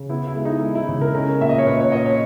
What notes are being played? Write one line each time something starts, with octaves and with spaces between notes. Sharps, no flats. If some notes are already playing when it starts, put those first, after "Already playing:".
Already playing: C#3
B3 E4
E4
G#3
D#4
G#3 E4
E4
C#3
A#4
C#4 A#4
A#2 E5
D#5
C#5
A#2 B4
C#5
A#2 D#5
C#5